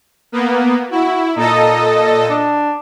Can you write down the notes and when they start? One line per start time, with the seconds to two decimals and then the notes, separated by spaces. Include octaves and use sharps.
0.32 A#3 B3
0.91 E4 F#4
1.36 A#2 D#4 A4 D#5
2.30 D4